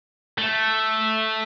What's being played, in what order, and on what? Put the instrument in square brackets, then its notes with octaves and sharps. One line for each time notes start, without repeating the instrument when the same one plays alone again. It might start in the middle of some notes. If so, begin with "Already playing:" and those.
[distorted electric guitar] A3